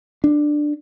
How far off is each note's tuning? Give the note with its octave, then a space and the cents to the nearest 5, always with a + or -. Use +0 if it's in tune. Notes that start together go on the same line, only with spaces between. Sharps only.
D4 +10